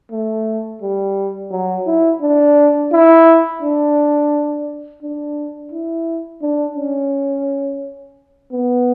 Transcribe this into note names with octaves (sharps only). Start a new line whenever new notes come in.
A3
G3
F#3
E4
D4
E4
D4
D4
E4
D4
C#4
B3